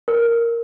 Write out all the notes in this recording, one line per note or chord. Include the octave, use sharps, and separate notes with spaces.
A#4